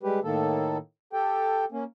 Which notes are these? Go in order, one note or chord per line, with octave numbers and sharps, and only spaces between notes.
G3 G#3 G4 B4
A2 D#3 A#3 A4
G4 A4 G5
A#3 C#4